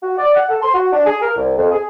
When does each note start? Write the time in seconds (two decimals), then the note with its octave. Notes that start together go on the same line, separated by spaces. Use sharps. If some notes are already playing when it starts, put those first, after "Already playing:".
0.03 F#4
0.18 D5
0.35 F#5
0.49 A4
0.62 C6
0.74 F#4
0.93 D4
1.06 G#4
1.22 A#4
1.36 C2
1.57 F2
1.71 G#4